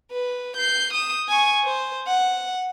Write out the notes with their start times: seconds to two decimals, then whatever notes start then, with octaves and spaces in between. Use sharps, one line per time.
0.11 B4
0.57 G6 C7
0.93 D#6 E7
1.28 G#5 C#6
1.64 C5
2.07 F#5